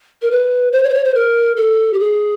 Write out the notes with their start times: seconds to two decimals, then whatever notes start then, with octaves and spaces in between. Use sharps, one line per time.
0.22 A#4
0.31 B4
0.72 C5
0.83 C#5
0.89 C5
0.93 C#5
1.04 C5
1.14 A#4
1.56 A4
1.93 G4
1.99 G#4